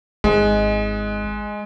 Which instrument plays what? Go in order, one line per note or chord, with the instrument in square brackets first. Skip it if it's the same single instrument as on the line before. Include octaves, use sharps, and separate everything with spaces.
[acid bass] G#1 [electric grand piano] G#3